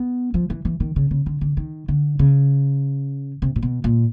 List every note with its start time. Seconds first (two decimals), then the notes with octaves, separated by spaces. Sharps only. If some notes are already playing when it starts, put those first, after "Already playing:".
Already playing: B3
0.34 F3
0.50 E3
0.65 E3
0.80 D#3
0.96 C#3
1.11 C#3
1.26 D3
1.41 D3
1.57 D#3
1.88 D3
2.19 C#3
3.42 C3
3.56 A#2
3.62 B2
3.84 A#2